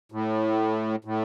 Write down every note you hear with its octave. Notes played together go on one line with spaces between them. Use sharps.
A2
A2